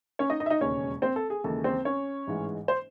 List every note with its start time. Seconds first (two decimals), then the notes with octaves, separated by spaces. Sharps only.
0.19 C#4 C#5
0.30 D#4 D#5
0.40 D#4 D#5
0.46 E5
0.50 D#4 D#5
0.61 E1 D#2 C#3 G#3 C#4 C#5
1.02 C4 C5
1.16 A4
1.30 G#4
1.44 D#2 C#3 E3 G#3 A4
1.64 C4 C5
1.85 C#4 C#5
2.27 A1 G#2 E3 G#3
2.68 C5